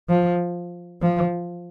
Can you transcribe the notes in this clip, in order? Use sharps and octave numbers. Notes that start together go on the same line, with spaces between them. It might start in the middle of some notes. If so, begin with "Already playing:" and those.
F3
F3